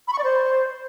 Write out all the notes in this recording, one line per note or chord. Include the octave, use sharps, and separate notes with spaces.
B5
C#6
D5
C5